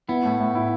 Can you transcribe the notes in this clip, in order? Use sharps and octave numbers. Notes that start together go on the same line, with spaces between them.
B3 E4
A2
A2
E4